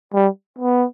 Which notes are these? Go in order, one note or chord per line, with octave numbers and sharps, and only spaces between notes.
G3
B3